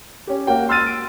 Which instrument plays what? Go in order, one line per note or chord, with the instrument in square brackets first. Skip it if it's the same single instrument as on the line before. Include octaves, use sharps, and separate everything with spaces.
[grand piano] C#4 G4
A#3 F#4 G5
C6 E6 F6 A6 D#7
D7